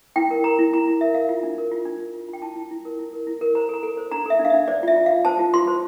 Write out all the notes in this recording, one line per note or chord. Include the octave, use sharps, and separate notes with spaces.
E4 G5
A#4
A#4 A#5
E4
E4 A#5
E4
A#4 E5
A#4 F5
F4 E5
D4
A#4
F4
D4
F4
F4
F4 G5
E4 A5
E4
E4
A#4
E4
A#4
E4
A#4
C5 A#5
A4 A#5
A4
C5
D4 A#5
A4 E5
D4
F5
E5
D4
C5 D5
F4
E5
F4
F5
F4
C5 A5
F4
F4 C6
C5